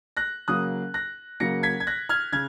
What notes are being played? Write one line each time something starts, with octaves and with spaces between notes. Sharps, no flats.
F#6 A#6
C#3 F#3 A#3 D#6 F#6
F#6 A#6
C#3 F#3 A#3 A#6 C#7
G#6 B6
G#6
F#6 A#6
F6 G#6
C#3 F6 G#6